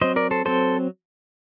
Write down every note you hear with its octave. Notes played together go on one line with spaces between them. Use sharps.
F#3 C4 C5 D#5
A#4 D5
A4 C5
F#3 C4 A4 C5